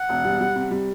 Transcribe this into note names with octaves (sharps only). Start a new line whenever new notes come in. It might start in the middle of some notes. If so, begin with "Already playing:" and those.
Already playing: F#5
E1
G3
G3
C3
G3